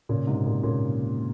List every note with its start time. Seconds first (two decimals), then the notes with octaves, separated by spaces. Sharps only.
0.09 A#2 C#3
0.27 G#2 C3
0.46 A#2
0.63 A#2 C#3